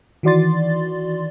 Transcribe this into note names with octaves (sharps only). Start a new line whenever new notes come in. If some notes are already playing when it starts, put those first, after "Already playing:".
D#3 E3 F#4 D5 C6 A6